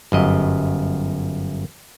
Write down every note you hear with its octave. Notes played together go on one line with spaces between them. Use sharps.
G1 F#2 D#5